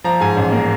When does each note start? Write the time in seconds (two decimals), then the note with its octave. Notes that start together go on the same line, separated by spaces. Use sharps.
0.04 F3 A#5
0.20 G#2 G#5
0.36 A1
0.52 A#3